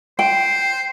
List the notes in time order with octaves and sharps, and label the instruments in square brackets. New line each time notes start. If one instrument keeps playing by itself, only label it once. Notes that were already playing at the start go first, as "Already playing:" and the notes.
[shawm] C5 [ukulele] G5